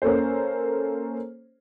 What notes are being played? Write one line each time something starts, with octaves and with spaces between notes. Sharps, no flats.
A#3 C#4 A4 C5